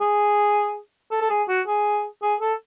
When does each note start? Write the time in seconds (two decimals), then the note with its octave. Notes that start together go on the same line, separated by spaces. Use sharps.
0.01 G#4
1.11 A4
1.21 A4
1.30 G#4
1.48 F#4
1.67 G#4
2.22 G#4
2.41 A4